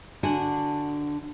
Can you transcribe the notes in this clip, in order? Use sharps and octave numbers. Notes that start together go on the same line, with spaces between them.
D3 D4 F#4 F#5 G#5